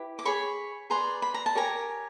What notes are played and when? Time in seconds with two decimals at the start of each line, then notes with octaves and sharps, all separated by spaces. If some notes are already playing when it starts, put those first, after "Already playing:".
Already playing: E4 G4 B4
0.19 D6
0.25 G#4 C#5 B5 C#6
0.90 G#4 B4 D5 A#5 C6
1.22 B5
1.34 A#5
1.46 A5
1.55 G4 A#4 C#5 G#5 A#5